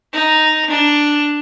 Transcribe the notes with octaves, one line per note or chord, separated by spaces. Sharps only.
D#4
D4